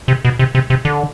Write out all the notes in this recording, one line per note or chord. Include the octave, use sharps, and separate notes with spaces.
C3
B2
C3
C3
C3
D3